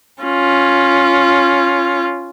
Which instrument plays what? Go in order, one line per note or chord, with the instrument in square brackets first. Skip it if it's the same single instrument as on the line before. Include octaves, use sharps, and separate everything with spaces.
[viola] C#4 F4